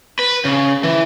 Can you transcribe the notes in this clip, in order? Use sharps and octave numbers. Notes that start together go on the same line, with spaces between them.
B4
C#3
E3